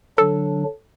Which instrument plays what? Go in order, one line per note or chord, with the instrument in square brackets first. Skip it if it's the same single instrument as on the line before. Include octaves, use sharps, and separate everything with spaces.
[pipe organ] D3 F#3 D4 [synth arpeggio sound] A4